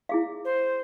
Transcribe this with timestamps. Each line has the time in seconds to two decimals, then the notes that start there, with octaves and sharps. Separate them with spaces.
0.09 E4 G#4 F5
0.44 C5